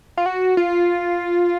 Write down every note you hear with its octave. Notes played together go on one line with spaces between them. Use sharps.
F4
F#4
F4